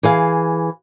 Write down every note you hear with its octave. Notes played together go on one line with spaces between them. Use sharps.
E3 G#4 F5